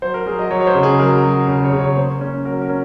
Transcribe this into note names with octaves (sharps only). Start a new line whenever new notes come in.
F#3 C5
A#4
F#3 G#4
D#5
F#3 C#5
C#5
C5
C#3
G#4
F#3 A#4
F#3
C#3
C#5
C#3
C#5
A#3 C5
C#4
F#3 A#4
A#4
C#4